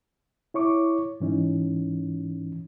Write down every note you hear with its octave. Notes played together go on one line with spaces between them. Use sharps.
E4 C#5 C#6 D6
G#2 E3 C#4 D#4